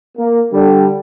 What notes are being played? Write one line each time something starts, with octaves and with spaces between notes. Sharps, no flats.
A#3
D3 G3